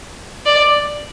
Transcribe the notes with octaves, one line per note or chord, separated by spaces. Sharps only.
D5